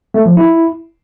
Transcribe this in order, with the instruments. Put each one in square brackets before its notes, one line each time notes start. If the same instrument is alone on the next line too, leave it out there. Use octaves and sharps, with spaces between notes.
[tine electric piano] A3
F3
E4